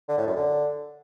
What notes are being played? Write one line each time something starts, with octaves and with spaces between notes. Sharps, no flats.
D3
A2
F#2
D3